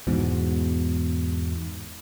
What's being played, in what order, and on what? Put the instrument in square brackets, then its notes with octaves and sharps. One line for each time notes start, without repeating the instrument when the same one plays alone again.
[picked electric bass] E2 G#2 B2